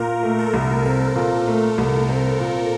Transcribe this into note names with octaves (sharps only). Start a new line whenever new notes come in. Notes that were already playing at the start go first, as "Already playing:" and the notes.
Already playing: A#2 A#4
A3
A4
C2
C4 A#4
A#2
A3
C2
C4
A#2